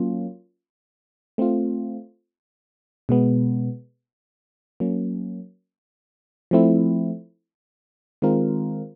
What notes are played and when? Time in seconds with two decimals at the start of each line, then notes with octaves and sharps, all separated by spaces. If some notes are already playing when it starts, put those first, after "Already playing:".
Already playing: F#3 A#3 C#4 F4
1.38 A3 C4 F4
3.09 B2 G#3 B3
4.80 F#3 A#3 C#4
6.51 F3 A3 C4 E4
8.22 D#3 G#3 C4 F4 A#4